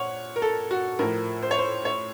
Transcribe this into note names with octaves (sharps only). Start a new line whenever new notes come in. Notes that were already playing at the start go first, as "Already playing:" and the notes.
Already playing: A#2 F3 C#5 F#5
A#4
A4
F#4
A2 F3 A#4
C5
C#5
C5
C#5